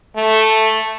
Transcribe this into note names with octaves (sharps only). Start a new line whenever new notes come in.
A3